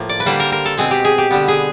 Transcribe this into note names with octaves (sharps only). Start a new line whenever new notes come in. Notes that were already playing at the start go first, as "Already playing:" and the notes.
Already playing: A2 F3 A#3
D5
B4
D3 G3 A#3 C5
A#4
A#4
A4
B2 G#3 C4 G#4
G4
G#4
G4
D3 G3 B3
G#4